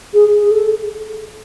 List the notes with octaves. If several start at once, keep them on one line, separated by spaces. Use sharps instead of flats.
G#4
G#4
A4